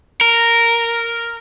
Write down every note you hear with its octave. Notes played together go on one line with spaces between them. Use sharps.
A#4